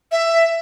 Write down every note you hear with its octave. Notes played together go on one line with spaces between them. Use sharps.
E5